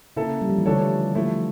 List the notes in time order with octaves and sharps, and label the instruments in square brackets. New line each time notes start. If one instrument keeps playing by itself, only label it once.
[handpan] C#3 [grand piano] A#3 E4 A4
[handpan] G3
F3
E3
[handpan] D3 [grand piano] F3 A3 D4 A4 C#5
[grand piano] F3 A3 E4